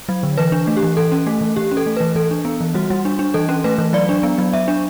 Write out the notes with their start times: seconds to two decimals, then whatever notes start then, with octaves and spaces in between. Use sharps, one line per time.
0.09 F#3
0.23 D3
0.37 E3 B4
0.52 D4
0.67 A3
0.77 G4
0.83 E3
0.97 E3 A4
1.12 C#4
1.27 A3
1.41 E3
1.56 E3 G4
1.71 C#4
1.77 A4
1.86 A3
1.97 E3 B4
2.15 E3 A4
2.31 D4
2.45 B3
2.61 E3
2.75 G3 F#4
2.90 G3
3.05 D4
3.19 D4
3.34 E3 A4
3.49 C#4
3.64 A3 B4
3.78 E3
3.93 F#3 D5
4.09 D4
4.23 B3
4.38 F#3
4.53 F#3 E5
4.68 D4